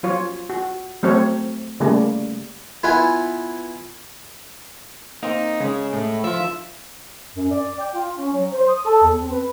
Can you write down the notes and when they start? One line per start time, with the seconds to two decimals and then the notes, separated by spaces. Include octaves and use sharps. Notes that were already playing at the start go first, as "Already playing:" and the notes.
0.03 F#3 F4 C#5
0.50 F#4
1.03 F#3 A3 C4 A4 C#5
1.80 C#3 G3 A3 A#3
2.83 B3 E4 F4 B4 G#5
5.23 A#3 C4 D#4
5.60 C#3 G#3
5.93 A2
6.24 F3 F4 E5
7.35 F#2
7.51 D5
7.79 G5
7.95 F4
8.16 C#4
8.33 F#3
8.52 C5
8.68 D#6
8.86 A4
9.03 E2
9.20 C4
9.32 B4